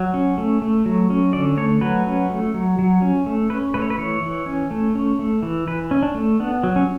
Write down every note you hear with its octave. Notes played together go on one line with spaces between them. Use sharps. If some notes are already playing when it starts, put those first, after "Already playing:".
Already playing: F#3
C#4
A3
A3
F#3
C#4
D3 D5
A3 C#5
F#3 B4
C#4
A3
F#3
F#3
C#4
A3
C#4 B4
A3 B4
C#5
B4
E3 C#5
E3
C#4
A3
C#4
A3
E3
E3 B4
C#4
D4
A3
B3 D4
F#3
C#4